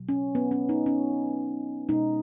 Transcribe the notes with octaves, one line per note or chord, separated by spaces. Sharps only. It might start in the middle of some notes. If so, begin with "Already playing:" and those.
Already playing: B2 F#3
C#4
B3
C#4
D#4
C#4
B2 G#3 D#4